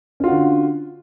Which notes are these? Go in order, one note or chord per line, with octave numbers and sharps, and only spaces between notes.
D3 C#4 F4 F#4